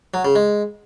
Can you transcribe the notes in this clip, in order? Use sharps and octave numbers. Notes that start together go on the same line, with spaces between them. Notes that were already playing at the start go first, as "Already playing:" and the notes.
F#3
C#3
G#3